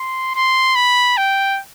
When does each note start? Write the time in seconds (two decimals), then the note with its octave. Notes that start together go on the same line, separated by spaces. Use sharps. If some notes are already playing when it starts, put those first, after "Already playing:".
Already playing: C6
0.35 C6
0.76 B5
1.17 G5